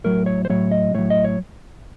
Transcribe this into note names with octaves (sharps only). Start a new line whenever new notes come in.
A2 F#3 A#4
C#5
C5
A2 F#3 C#5
D#5
A2 F#3 C#5
D#5
C#5